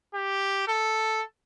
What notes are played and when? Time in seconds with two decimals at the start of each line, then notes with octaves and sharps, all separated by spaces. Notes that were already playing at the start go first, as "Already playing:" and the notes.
0.14 G4
0.68 A4